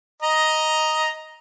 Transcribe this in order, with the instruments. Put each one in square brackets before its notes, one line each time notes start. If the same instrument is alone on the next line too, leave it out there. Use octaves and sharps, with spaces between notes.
[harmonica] D#5 A#5